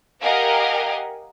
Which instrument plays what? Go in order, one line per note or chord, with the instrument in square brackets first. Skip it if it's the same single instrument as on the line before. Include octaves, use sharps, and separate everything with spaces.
[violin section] G4 A#4 D#5 F5 F#5 G#5